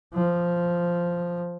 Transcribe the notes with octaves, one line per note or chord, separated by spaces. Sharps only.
F3